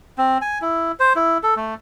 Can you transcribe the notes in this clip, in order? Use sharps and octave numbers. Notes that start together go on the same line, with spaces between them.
C4
G#5
E4
C5
E4
A4
A3